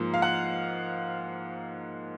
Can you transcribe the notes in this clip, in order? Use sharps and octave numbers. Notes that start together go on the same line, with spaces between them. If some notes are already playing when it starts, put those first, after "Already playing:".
Already playing: G#2 F3 A#3
F5
F#5